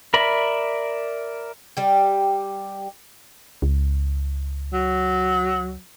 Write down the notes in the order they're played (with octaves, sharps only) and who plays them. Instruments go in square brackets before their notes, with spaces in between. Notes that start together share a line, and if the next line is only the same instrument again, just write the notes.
[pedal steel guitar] A#4 D5 E5 B5
[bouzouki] G3 G4
[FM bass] C#2
[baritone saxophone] F#3